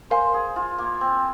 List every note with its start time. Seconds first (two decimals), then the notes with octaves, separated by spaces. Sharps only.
0.10 A#4 C5 F5 G#5 C6
0.34 G#4
0.56 F4
0.78 A#3
1.01 C4